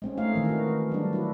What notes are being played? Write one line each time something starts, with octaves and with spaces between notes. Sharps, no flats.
G#3 C4 C#4
A3 D#4 F5
D#3 E3 A#4
D#4 F#4
F#3 G3 D4
E4 F#4